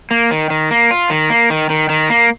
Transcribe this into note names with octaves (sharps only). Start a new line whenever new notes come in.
A#3
D#3
D#3
A#3
F4
D#3
A#3
D#3
D#3
D#3
A#3